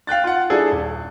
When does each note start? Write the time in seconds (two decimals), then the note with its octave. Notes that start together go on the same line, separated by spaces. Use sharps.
0.07 F5 G5 F#6 A6
0.24 F4 F#5
0.50 G3 D4 E4 G#4 A4
0.71 D#1